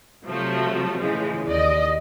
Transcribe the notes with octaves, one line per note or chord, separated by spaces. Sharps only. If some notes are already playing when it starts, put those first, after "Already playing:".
C3 F3 F#3 A3
A2 C#3 E3 F3 G#3
D#2 D5 D#5